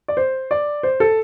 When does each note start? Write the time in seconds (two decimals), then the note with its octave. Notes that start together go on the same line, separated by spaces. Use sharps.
0.08 D5
0.17 C5
0.51 D5
0.83 C5
1.00 A4